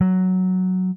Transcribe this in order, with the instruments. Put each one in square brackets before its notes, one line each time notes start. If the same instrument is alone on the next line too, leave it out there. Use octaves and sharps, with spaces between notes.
[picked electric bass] F#3